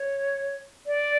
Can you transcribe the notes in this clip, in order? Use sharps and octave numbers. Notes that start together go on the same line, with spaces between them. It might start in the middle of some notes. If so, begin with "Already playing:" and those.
Already playing: C#5
D5